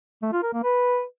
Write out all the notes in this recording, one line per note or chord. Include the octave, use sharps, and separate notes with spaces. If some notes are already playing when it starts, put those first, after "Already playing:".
A3
F4
A#4
A#3
B4